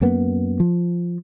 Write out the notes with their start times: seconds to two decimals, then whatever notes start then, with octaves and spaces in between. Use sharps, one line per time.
0.01 F#2 A#3 B3
0.60 F3